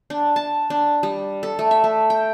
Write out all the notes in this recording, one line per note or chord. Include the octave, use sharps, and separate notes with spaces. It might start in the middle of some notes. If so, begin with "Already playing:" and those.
D4
A5
D4
G3
A4
A3
E5
A3
G5